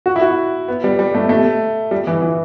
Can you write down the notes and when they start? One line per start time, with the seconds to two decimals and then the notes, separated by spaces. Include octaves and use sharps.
0.06 F#4
0.16 E4
0.21 F#4
0.68 B3
0.84 G3
0.99 G3
1.15 A3
1.29 A3
1.91 G3
2.07 E3
2.22 E3